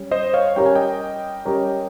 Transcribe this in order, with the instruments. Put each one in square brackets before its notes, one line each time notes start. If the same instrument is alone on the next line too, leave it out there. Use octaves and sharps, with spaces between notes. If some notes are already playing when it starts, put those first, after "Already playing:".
Already playing: [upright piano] G3 C#4
[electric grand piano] C5 D#5
C#5 F5
[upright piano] G3 C#4 G4 A#4 C#5 [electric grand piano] G5
[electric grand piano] G#5
D#5 G5
[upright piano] G3 C#4 G4 A#4 C#5